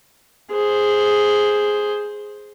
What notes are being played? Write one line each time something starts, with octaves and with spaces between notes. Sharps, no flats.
G#4 C5